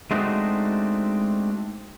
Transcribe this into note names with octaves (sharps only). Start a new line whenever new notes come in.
G#3 A3 C4 D4 D#4 F#4